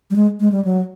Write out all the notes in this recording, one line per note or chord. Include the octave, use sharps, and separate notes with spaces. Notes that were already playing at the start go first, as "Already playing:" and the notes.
G3
G#3
G#3
G3
F#3